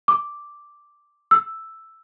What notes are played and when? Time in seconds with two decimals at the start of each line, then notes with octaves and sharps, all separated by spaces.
0.08 D6
1.31 E6